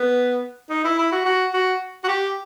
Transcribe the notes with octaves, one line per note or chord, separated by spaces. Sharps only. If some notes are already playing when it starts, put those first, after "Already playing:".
Already playing: B3
D#4
E4
E4
F#4
F#4
F#4
F#4
G4